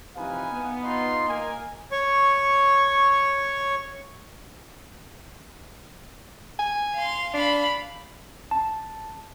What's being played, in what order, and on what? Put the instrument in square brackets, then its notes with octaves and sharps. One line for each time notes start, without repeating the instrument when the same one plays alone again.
[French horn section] C3 E3 F3 [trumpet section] D#4 B4 G#5 [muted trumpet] F5
[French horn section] B3
[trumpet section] D#4 F4 C6 [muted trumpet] D#5
[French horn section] A#3 [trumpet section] A#4 G#5
[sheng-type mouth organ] C#5 C#6
[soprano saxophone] G#5
[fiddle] F5 C6
[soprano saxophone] D4 [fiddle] F5 B5
[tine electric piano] A5